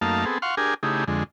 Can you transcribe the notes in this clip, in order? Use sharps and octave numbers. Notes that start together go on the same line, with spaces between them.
F#2 A3 A#3 D#4 F5 A5
B3 C4 G#4 A4
F5 F#5 C6 C#6
D4 G4 G#4 A#4 G#5
C#3 A3 D#4 E4 G4 G#4
F2 D3 G#3